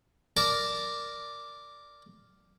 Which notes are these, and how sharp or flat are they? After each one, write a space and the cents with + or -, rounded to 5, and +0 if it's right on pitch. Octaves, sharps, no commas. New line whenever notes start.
A#4 -5 D5 +0 A5 +0